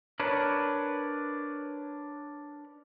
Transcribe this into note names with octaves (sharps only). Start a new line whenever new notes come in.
D4 A#4 B4 C#5